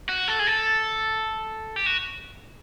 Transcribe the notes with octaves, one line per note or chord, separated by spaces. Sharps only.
F#4
A4
G#4
A4
G4
F#4